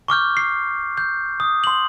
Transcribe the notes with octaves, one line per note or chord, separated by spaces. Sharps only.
C#6 D6 F6 G6
C7
G6
D#6
C6 F#7